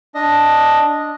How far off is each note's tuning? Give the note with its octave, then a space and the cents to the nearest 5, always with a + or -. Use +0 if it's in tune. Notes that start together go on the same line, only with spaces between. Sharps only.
D4 +0 D#5 +0